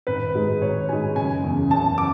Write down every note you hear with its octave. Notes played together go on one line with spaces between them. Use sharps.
G#1 B4
G#2 G#3
G#1 C#5
G#2 G#3 G#5
F#1 G#5
E2 C#3
F#1 A5
D6